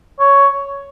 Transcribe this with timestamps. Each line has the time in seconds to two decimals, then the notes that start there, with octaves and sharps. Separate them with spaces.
0.20 C#5